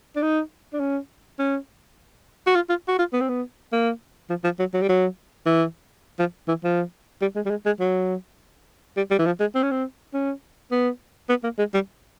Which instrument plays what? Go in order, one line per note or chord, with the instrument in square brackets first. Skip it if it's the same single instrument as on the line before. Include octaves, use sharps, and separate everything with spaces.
[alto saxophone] D4
D#4
D4
C#4
C#4
F#4
F4
F4
F#4
F4
B3
C4
B3
A#3
F3
F3
F#3
F#3
G3
F#3
E3
F3
E3
F3
G3
G#3
G3
G#3
G#3
F#3
G3
G3
E3
F3
G#3
C4
C#4
C4
C#4
B3
B3
A#3
G#3
G3